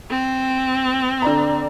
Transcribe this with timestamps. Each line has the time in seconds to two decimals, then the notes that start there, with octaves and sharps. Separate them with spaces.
0.10 C4
1.22 D3 D5 A#5